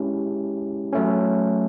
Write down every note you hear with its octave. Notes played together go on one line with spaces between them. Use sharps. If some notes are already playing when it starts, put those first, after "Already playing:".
Already playing: G#3 C#4 E4 G4
F#3 A3 C#4